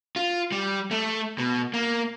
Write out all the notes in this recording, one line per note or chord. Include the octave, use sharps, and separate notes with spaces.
F4
G3
A3
B2
A#3